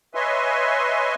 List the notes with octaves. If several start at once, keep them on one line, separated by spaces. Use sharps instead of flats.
B4 C#5 D#5 E5 G#5 C6